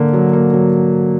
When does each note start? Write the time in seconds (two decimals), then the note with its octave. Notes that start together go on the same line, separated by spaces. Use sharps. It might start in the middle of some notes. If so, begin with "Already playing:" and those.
Already playing: D3 A#3
0.14 F#3
0.33 A#3
0.54 F#3